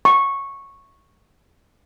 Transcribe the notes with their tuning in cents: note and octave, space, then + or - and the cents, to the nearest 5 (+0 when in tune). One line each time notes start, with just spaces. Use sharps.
C#6 -10